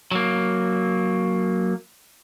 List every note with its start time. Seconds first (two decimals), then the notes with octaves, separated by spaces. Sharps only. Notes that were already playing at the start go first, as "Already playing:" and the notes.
0.11 F#3 A#3